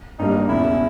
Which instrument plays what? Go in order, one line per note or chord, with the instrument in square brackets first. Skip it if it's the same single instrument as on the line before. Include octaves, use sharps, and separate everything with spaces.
[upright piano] G#1 G2 G3 A#3 [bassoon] D#4
[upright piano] E1 E2 C#3 E3 [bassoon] E4